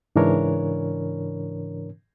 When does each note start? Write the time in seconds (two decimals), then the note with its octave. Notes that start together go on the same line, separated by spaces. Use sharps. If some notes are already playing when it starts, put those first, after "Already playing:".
0.16 G#2 C#3 E3 D4 A#4 C#5